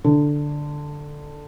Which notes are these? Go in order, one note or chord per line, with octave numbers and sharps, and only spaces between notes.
D3